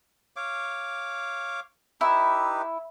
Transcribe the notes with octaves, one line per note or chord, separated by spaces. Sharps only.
C#5 F5 D6
D#4 E4 G4 B4